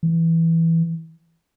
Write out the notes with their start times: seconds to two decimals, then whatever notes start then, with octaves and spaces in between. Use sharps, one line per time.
0.03 E3